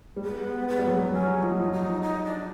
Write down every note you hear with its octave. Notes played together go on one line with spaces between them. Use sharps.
G3
G#3 B3
G#3 B3
G3
F#3
G3
F#3 C#4
F3 D#4
F#3
F3
F#3 D#4
D#4
D4